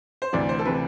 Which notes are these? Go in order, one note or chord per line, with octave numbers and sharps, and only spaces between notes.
C5
D2 C3 E3 D5
C5
A4
C3 E3 B4